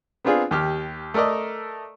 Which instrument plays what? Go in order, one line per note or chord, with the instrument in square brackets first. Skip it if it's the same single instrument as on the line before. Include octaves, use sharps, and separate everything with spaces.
[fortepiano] B3 C4 D4 F4 G#4
D#2 G4 F6
A3 A4 A#4 D5 D#5